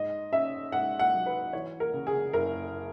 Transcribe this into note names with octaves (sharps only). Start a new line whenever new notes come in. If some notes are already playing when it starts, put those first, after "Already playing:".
Already playing: G#2 D#5
C#4 E5
G#2 F#5
F#5
F#3
B4
E3 C#5
A#4
C#3
G#4
F#1 A#4